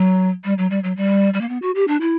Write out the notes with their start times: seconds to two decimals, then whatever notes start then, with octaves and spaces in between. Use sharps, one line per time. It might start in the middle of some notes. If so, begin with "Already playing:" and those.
Already playing: F#3
0.45 G3
0.58 F#3
0.70 G3
0.84 F#3
0.97 G3
1.34 G3
1.41 A#3
1.49 B3
1.62 F#4
1.75 G4
1.88 D4
2.01 E4